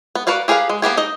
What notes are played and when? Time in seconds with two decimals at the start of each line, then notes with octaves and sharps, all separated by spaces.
0.15 B3
0.27 F#4 A#4 B4 D5 F5
0.48 G4 G#4 A#4 B4 F5
0.69 G#3
0.82 A#3 B3 G4 G#4
0.97 D#4 D#5